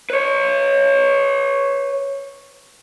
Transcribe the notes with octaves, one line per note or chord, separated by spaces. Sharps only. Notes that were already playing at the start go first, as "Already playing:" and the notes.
B4 C#5